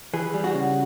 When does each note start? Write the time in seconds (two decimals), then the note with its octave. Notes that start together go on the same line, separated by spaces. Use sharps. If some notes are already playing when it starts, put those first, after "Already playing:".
0.14 E3 G#4
0.34 G3
0.44 F#4
0.54 C#3